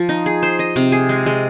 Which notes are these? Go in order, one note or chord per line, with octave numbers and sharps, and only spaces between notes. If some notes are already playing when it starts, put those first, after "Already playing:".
Already playing: F3
D#4
G#4
C5
D#5
C3
G#4
G#3
G#3